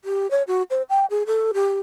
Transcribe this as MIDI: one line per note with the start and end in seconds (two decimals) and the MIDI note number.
0.04 0.29 67
0.31 0.43 73
0.47 0.63 66
0.70 0.82 72
0.90 1.06 79
1.10 1.23 68
1.27 1.52 69
1.54 1.81 67